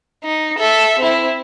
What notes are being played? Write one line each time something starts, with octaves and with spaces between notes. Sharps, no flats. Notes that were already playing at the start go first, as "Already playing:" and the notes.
D#4
A4 E5
C4 E4